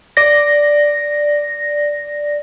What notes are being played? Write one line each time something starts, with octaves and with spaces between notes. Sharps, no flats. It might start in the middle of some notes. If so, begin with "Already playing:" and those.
D5 A#6